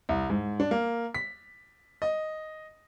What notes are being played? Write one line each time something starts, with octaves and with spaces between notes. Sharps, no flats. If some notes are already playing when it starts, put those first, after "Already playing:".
C2
G#2
D4
A#3
B6
D#5